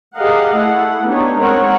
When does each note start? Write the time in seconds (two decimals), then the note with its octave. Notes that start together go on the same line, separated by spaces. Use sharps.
0.17 G4 G#4 A#4 D#5 F5 F#5
0.56 A3 E4 A4 F#5
1.07 B3 D4 D#4 G4 C#5
1.39 G#3 C4 A#4 C#5 F#5